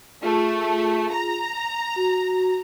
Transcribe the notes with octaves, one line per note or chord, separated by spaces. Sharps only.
A3 F4 G#4
A#5
F#4